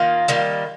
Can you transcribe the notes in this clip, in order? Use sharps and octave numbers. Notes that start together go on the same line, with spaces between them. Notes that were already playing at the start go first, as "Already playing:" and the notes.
Already playing: D#3 A#3 F4
D#3 G3 A#3